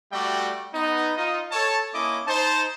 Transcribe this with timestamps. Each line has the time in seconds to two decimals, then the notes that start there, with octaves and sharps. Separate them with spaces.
0.12 G3 A3 F#4 D5 E5 G5
0.74 B3 D#4
1.17 D#4 F4 D#5
1.52 A4 C#5 A5
1.93 A#3 C#4 E4 D#5 D6
2.26 D#4 C5 A5